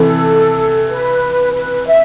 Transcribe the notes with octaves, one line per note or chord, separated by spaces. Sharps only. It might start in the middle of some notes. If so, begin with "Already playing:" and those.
Already playing: C3 E3 A4
B4
B4
E5